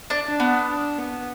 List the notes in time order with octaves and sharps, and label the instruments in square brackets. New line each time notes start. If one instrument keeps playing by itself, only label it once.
[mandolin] D4
[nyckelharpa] D4
[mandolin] B3
[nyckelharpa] D4
B3